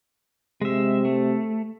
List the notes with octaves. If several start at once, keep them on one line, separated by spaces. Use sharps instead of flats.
C3 G#3 E5
A3